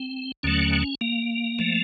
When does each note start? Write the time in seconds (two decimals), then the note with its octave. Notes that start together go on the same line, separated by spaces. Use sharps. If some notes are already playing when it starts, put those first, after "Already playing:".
Already playing: C4
0.43 D#2 D3 F#3 A3 C#4
1.01 A#3
1.59 F3 A3